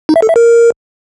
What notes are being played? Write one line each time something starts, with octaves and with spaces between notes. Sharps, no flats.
D#4
E5
A4
E5
A#4